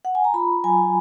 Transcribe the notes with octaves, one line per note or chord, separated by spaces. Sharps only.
F#5
G#5
A#5
F4 B5
F#3 G#5